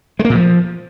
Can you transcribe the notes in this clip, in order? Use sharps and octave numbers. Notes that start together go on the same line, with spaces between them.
G#3
A#3
A#2
F3